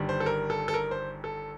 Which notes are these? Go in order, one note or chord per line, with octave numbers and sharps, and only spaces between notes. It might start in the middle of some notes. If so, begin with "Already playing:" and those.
Already playing: G1 G2 D#3 G3
C5
A4
A#4
A4
A4
A#4
C5
A4